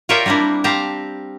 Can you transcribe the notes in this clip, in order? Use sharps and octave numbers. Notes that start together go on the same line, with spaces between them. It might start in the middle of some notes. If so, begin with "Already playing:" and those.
F4 A#4 C#5 D5 E5 G5
G3 A#3 C4 D4 E4
C4 G4 F5 A5 A#5